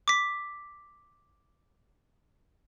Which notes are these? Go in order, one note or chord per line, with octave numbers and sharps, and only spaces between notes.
D6 B6